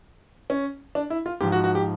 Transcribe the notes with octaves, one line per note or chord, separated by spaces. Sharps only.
C#4
D4
E4
F4
G#2 F3 G4
F#4
F#4
G4